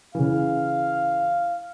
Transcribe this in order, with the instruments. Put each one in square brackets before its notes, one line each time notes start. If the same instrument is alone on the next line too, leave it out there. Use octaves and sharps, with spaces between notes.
[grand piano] C#3 E3 [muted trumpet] F5